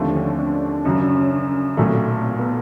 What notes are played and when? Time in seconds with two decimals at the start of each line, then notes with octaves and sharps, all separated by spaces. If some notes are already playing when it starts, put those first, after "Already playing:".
Already playing: D#2 D3 F3 A3 C4
0.08 D4
0.15 C#4
0.39 D4
0.62 D4
0.85 F#2 C#3 F#3 C#4
1.01 D4
1.15 C#4
1.31 D4
1.54 C#4
1.77 B1 A#2 F#3 A3 C4
2.24 C4
2.39 B3